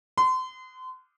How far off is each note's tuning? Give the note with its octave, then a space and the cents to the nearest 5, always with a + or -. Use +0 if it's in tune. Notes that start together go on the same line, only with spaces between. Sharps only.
C6 -30